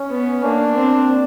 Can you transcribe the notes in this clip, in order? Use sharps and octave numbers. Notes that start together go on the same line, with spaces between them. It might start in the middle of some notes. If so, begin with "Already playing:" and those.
Already playing: C#4
B3
A#3 D4
C4